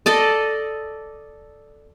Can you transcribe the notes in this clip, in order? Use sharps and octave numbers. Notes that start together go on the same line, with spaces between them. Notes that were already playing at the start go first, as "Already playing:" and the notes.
A4 D5 D#5